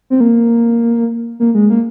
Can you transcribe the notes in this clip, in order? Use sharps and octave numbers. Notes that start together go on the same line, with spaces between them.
C4
A#3
A#3
G#3
A#3